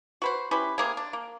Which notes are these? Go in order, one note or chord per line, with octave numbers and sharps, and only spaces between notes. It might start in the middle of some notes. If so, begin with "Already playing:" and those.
F#4 B4 C5
C#4 E4 G4 B4
C3 A#3 G#4
D4
A#3